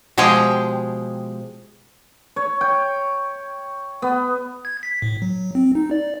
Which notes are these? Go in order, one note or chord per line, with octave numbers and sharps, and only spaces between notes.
B2 F3 G#3 G4 G#4 G5
C#5
G5
B3
G#6
B6
A2
F#3
C4
D#4
D5